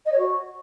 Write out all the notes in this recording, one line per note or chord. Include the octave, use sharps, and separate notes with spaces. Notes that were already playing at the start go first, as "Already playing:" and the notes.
D#5
C#5
F#4